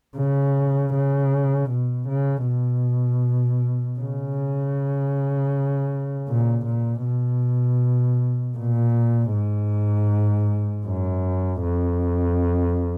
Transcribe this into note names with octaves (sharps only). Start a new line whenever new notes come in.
C#3
C#3
B2
C#3
B2
C#3
A#2
A#2
B2
A#2
G#2
F#2
F2